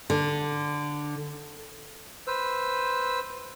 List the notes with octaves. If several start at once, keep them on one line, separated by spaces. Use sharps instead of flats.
D3
B4 C5 E6